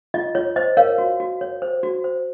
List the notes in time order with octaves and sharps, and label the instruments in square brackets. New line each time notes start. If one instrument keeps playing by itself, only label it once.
[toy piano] F4 D#5
F4 C#5
C5 D#5
A#4 C#5 F5
F#4
F#4
C#5
C5
F#4
C5